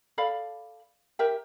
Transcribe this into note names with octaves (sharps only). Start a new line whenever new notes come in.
A4 D5 F5 B5
G4 A#4 E5 G5